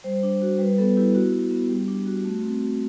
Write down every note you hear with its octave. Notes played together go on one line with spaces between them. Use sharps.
G3 C5
D4
F#4
G3 B4
B3 A4
E4 G4
F#4
F#4
B3
G3 G4
D4
F#4
A3
C4
F#4